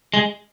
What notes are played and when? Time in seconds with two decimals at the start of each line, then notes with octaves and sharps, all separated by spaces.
0.14 G#3